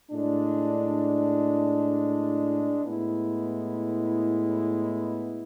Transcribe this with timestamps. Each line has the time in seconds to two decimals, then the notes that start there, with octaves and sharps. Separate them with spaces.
0.10 A2 G#3 D4
2.84 A2 G#3 B3 E4